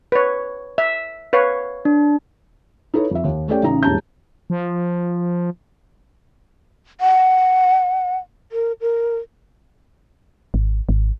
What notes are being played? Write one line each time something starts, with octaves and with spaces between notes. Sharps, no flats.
B4 C#5
E5
B4 C#5 F5
D4
D#4 E4 A4 B4 C#5
F2 E5
D#2
A3 C#4 G4 A4 D5 G5
A1 C#3 D#4 A#5
E1 A2 G3 A5 A#5 G6
F3
F#5
A#4
A#4
G#1
G#1